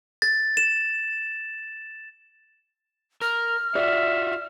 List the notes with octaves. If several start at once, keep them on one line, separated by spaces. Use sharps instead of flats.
A6
E7
A#4 F6
F4 F#4 D5 E5